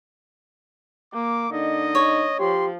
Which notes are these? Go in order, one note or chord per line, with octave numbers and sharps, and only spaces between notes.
A#3 D6
D3 D#4 D#5
C#5
F3 G4 C6